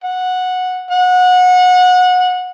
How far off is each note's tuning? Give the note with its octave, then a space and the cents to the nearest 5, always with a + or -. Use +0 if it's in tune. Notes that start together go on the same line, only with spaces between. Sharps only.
F#5 -10
F#5 -25